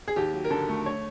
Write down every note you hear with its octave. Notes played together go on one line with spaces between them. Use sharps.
G#4
D#2 G4
F#3
A#4
D3 A4
A3
C#5